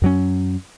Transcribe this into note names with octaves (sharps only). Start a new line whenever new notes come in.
F#2 F#3 C#4